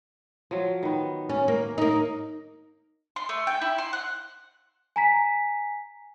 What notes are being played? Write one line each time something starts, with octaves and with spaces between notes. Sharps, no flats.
F3 F#3
D#3 B3
C#4
A#3
A#3 D#4
C6
A3
G5
E4
C6
F#5
G#5 A#5 B6